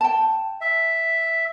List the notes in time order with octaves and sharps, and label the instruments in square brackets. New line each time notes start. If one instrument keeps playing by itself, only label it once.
[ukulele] G5 A5
[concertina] E5